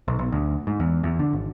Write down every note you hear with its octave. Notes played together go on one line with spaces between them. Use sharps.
B1
B1
D2
G#2
E2
E2
D3
G#1